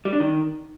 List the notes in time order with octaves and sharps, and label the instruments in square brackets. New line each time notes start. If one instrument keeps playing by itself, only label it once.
[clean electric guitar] G3
D4
D#3